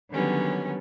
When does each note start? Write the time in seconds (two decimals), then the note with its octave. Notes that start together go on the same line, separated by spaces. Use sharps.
0.10 D3 D#3 F#3 G3 B3 C#4